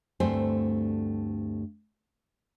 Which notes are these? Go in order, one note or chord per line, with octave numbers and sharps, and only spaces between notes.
D2 G2 A3 C4 C5 G#5